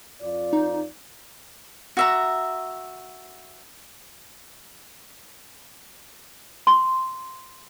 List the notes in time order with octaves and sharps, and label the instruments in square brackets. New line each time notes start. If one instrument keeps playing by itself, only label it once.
[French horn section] F2 F4 D5
[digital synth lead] D#4
[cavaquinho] F#4 E5 A#5
[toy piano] C6